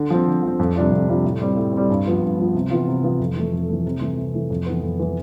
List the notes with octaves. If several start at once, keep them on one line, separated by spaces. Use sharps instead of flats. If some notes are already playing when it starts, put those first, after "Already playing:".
Already playing: D3
F3 C4
D3
F3 C4
F2
C3 G3 D4 F4
F2
C3 G3 D4 F4
A2
G3 C4
A2
G3 C4
G2
F3 B3 F4
G2
F3 B3 F4
C3
E3 B3 F4
C3
E3 B3 F4
F2
E3 A3
F2
E3 A3
C3
E3 A3
C3
E3 A3
F2
E3 B3
F2
E3 B3